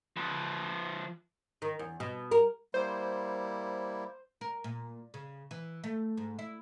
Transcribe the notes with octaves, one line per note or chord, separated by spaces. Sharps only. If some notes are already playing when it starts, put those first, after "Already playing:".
F3 B4
D#3
E2
B2
A#4
G3 A#3 E4 C5
A#4
A#2
C#3
E3
A3
G#2
E4